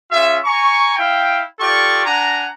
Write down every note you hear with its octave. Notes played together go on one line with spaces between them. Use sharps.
C#4 F4 G#4 E5
G#5 A#5 C#6
E4 F5 G5
F4 G4 A4 D5 C#6
D4 F#5 G#5 A#5